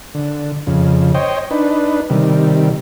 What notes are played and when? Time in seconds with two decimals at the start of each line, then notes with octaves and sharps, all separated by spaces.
0.15 D3
0.67 F2 C#3
1.15 C5 C#5 D#5 G5
1.51 D4 D#4 B4
2.10 C3 D#3 G3